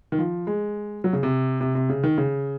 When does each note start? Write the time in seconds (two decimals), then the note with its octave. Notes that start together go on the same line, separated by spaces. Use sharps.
0.12 D#3
0.18 F3
0.47 G#3
1.04 F#3
1.13 C#3
1.23 C3
1.61 C3
1.75 C3
1.89 C#3
2.04 D#3
2.18 C#3